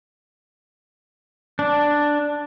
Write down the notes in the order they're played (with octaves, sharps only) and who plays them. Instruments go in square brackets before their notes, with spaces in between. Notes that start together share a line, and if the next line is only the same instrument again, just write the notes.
[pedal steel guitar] D4